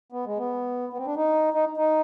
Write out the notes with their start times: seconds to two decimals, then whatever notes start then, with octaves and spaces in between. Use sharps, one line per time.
0.12 B3
0.26 G#3
0.38 B3
0.93 B3
0.98 C4
1.06 D4
1.16 D#4
1.54 D#4
1.77 D#4